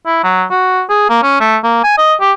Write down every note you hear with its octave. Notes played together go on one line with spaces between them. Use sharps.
E4
F#3
F#4
G#4
A#3
C#4
A3
A#3
G#5
D#5
G4